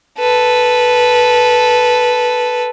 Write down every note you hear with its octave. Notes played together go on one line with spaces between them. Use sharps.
A4 B4